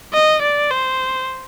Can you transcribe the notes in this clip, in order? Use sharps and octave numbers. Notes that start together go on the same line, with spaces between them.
D#5
D5
C5